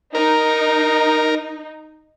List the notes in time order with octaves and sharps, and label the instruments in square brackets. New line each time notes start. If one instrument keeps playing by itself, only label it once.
[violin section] D#4 [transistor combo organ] A#4